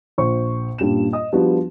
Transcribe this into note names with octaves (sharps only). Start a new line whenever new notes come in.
A#1 C5 C#6
G2 A#2 G3 C#4 E7
D#5 D#6
F3 G3 B3 D4 F#4 G4